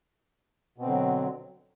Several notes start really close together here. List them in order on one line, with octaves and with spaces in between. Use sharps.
B2 C4 D3 F#3